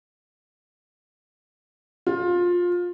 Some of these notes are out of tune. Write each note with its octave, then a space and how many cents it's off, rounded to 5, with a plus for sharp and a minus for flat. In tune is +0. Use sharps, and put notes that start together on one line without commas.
F4 +20